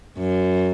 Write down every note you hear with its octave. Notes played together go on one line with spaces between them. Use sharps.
F#2